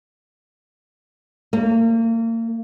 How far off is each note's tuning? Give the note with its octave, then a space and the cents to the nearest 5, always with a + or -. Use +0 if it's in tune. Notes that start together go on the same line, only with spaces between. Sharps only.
A#3 -35